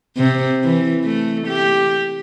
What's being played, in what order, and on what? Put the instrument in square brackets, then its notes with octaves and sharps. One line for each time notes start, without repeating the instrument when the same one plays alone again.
[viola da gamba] C3
E3
A3
G4